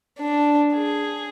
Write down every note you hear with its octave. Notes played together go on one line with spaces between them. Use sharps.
D4
G#4